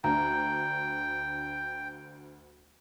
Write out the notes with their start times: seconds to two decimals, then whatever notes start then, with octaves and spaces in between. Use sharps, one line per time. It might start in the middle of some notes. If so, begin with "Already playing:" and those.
0.04 D2 D4 G5 A#5